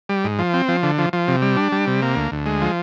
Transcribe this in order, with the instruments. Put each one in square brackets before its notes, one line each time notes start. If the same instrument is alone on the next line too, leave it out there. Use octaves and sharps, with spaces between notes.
[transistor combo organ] G3
G#2
F3
C4
F3
D3
F3
F3
C3
G3
D4
G3
C3
A#3
D2
D2
G#3
F3